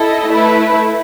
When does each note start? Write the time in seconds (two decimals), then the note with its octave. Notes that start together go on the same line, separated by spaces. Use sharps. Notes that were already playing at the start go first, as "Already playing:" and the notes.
Already playing: E4 A4 D#5
0.27 A3 E4 B4